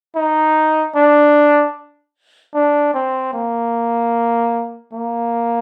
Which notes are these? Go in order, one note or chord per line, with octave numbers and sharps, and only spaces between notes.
D#4
D4
D4
C4
A#3
A#3